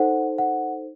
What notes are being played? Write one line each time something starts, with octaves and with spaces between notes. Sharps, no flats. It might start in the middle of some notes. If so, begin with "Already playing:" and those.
Already playing: D#4 A4 C5 F#5
F#5